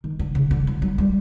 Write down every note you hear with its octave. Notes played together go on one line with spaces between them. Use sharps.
D#3
D3
C#3
D3
F3
F#3
G3